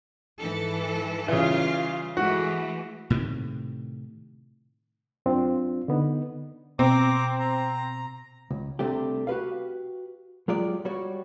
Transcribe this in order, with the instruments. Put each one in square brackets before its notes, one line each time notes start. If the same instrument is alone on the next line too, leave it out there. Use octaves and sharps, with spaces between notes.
[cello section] G#2 E3 A4
[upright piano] C#3 E3 [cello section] G3 F4 F5
[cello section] E3 G#3 A3 [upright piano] F#4
[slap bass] A2 C3 D#3
[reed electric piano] F#2 C4 D4 F4
D3 B3 D#4
[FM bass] B2 [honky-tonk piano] C4 [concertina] A#5 D6
[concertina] A#5
[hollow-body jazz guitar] C#2
C2 C3 A3 D4 G4
F#4 G4 B4 F5
F#3 G#3 F4 G4 D5
G3 F#4 C#5